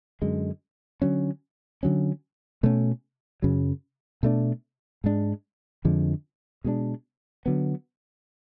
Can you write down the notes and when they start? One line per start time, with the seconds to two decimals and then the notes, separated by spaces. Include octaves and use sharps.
0.22 F#2 D3 G#3
1.02 D3 F#3 C#4
1.83 D3 F#3 C#4
2.63 B2 A3 C#4
3.42 F#2 C#3 F#3
4.23 B2 A3 D4
5.04 G#2 G#3 D4
5.85 F2 D3 F3 G#3
6.64 B2 G#3 B3 D4
7.46 D3 F#3 B3